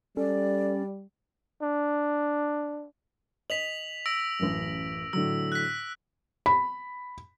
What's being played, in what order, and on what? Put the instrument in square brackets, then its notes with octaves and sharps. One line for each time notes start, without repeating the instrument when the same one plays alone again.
[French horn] G3 [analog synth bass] C#4 [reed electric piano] A4 [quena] D5
[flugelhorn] D4
[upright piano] D#5 [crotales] B6 F7 F#7
[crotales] E6 A#6 D7
[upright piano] A1 F#2
[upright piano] A2 D3 F#3 [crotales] E6
[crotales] F#6 B6
[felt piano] B5